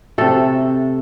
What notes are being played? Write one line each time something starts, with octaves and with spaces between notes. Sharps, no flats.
C3 A3 A4